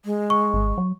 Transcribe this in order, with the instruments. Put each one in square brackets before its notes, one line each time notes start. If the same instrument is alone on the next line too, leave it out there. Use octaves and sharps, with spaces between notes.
[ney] G#3
[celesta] C#6
[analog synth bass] G#1
F#3